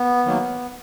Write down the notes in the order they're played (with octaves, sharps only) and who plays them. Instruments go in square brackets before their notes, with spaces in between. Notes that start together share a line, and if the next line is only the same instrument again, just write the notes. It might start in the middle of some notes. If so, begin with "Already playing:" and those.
Already playing: [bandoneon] B3
D#3 F#3 A#3